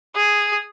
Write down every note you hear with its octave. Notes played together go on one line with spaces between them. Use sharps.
G#4